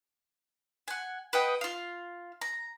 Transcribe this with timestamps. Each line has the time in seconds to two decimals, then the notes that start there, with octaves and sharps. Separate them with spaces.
0.88 F#5 G#5
1.33 B4 D#5 F#5 G5
1.61 F4 F5
2.41 A#5